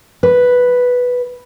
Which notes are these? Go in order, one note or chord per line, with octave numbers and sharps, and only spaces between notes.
B4